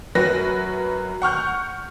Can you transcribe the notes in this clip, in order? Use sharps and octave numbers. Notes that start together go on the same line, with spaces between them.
F#2 F#4 A#4 B4 A#6
F#5 C#6 F6 G6